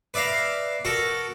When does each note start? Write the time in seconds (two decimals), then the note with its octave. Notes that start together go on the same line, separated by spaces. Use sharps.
0.14 B4 D5 E5 F5 A#5
0.85 F#4 A4 A#4